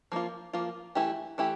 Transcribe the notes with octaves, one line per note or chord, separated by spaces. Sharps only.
F3 A#3 F4
F3 A#3 F4
E3 A3 E4 G4
E3 A3 E4 G4